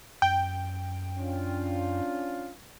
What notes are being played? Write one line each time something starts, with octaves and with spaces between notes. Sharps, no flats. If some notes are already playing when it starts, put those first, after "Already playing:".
F#2 G5
C#4 D4 F4